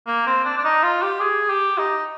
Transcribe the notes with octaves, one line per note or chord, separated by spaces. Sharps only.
A#3
C4
D4
D4
D#4
F4
G4
G#4
G4
D#4